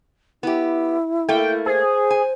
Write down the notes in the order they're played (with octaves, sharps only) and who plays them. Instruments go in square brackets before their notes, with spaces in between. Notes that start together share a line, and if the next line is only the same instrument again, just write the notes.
[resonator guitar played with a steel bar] B3 G4 [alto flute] E4
[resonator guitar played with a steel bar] A3 A#3 [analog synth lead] G5
[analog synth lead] G#4 [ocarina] C5
[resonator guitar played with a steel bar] G#5